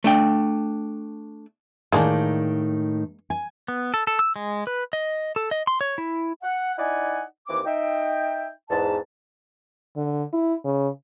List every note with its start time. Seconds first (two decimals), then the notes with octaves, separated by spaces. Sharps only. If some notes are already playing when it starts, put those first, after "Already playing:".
0.04 A3 D4 G5
1.92 A2 D#3 G#3 A#3 D4
3.30 G#5
3.68 B3
3.94 A4
4.07 A4
4.19 E6
4.36 G#3
4.67 B4
4.93 D#5
5.36 A4
5.51 D#5
5.67 C6
5.81 C#5
5.98 E4
6.44 F#5
6.78 D#4 E4 D5 D#5 F#5 G#5
7.49 D#2 E3 C4 D6
7.66 D#4 E5 G5
8.70 E2 G#2 A5
9.96 D3
10.33 E4
10.64 C#3